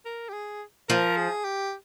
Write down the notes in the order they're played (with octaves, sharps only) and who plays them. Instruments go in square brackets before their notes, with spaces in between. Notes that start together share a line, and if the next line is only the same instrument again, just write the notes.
[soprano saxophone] A#4
G4
G#4
[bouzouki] F3 [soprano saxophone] A#4
[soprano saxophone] G#4
G4